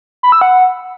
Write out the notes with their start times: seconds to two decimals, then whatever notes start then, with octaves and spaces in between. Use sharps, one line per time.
0.23 B5
0.32 E6
0.41 F#5